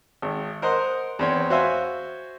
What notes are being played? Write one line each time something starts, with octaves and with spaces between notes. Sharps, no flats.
G#1
A#4 C5 D#5 F#5
E2 C4 C#5
F#4 C5 C#5 E5 F5 G#5